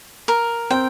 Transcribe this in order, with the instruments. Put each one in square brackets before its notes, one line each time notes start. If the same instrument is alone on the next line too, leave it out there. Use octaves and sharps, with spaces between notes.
[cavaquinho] A#4
[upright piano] C4 [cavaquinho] G5